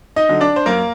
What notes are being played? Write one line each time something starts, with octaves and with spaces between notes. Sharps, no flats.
D#4 D#5
D3 F#3
D4 D5
C5
F#2 A#3 A#4